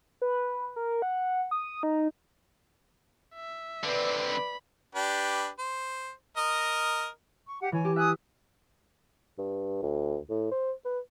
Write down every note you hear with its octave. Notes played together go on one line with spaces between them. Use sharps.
B4
A#4
F#5
D#6
D#4
E5
D3 C4 B4 D5
B5
D4 G4 B4
C5
A#4 D#5
C#6
G4 F#5
E3 C#5 G#5
G4
E5 G#5 D#6 F#6
G2
D2
A2
C5
B4